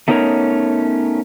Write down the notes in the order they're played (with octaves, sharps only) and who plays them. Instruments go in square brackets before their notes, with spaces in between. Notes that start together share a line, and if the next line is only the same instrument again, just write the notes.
[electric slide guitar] A3 B3 C#4 D#4 A#4 C#5